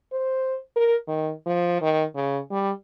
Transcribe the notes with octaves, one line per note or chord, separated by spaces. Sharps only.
C5
A#4
D#3
F3
D#3
C#3
G3